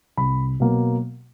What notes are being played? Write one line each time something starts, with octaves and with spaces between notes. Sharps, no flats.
C2 B5
B2 F#3 A#3